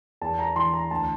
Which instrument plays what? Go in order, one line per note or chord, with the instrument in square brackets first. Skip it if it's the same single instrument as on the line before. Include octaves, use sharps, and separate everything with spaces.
[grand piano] E2 A5
A#5
E3 C6
A#5
D2 A5